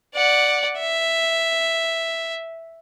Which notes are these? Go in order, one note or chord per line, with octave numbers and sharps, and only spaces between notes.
D5 F#5
E5